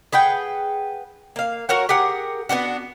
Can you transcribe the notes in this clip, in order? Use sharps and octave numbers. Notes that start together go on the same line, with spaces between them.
G#4 B4 F#5 G5
A#3 F5
F#4 A#4 C#5 F#5
G4 G#4 A#4 F#5
B3 C#4 D4 F#4